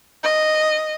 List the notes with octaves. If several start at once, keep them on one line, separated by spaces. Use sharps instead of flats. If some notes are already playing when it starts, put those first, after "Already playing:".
D#5